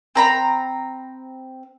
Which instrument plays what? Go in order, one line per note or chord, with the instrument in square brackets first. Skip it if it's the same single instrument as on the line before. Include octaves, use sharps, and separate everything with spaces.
[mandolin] C4 A#5 B5